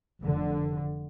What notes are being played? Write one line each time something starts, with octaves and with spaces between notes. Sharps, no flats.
F1 D3